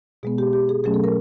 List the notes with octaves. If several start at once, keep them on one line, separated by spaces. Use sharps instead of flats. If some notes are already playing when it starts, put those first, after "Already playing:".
B2 G#3 B3 G#4
G4
G4
G#4
B2 F#3 A3 C#4 G#4
A4
A#4